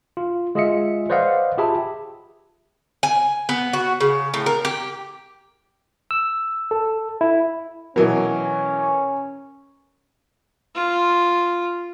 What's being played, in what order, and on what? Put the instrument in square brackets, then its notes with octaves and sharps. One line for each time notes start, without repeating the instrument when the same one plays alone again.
[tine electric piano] F4
G#3 F4 G#4 D#5 E5 C#7
B4 C5 D5 D#5 F5 F#5
F4 G4 G#4 E5 A5 B5
[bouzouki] G#5
B3
F#4
C#3
A2
A#4
G4
[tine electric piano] E6
A4
E4
[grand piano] B2 E3 F#3 [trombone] C#4 [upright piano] A#4
[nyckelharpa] F4